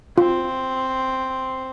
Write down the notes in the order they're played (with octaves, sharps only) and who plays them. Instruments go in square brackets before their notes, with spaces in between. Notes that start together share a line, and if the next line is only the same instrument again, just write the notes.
[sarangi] C4 [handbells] F4